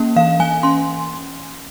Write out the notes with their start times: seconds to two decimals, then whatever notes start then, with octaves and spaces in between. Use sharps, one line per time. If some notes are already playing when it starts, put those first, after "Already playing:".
Already playing: A#3 C#4
0.16 E3 F5
0.39 E3 G#5
0.63 C#4 C6